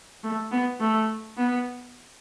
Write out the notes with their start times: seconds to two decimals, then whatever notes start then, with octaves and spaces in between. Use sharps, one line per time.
0.24 A3
0.51 B3
0.80 A3
1.37 B3